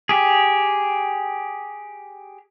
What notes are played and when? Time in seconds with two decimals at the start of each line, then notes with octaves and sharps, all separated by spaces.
0.09 G4 G#4